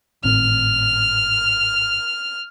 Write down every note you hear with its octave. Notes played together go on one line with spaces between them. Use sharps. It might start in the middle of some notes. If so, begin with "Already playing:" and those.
G#1 A2 C4 F6